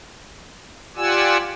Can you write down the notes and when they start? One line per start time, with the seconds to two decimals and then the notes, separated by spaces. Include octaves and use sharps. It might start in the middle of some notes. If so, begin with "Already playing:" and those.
0.96 F4 G4 D5 F#5 G#5 E6